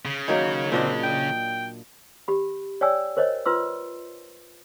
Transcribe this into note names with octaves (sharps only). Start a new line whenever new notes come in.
C#3
D#3 F#3 A#3 C#5
A#2 C4 D4 D#5
G5
G4 B5
C#5 D5 G5 G#5 E6
A#4 C5 C#5 D#5
F4 B4 C6 E6